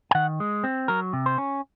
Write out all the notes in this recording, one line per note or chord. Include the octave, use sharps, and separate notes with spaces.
G#5
D#3 F#5
G#3
C4
F#3 A#4
C3
C5
C#4